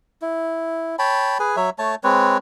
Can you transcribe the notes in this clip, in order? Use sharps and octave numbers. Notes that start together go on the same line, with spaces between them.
E4
C#5 G5 A5 B5
G#4 B4 G#5
F#3 C#5 E5
A3 C#5 A5
G#3 C4 B4 C#5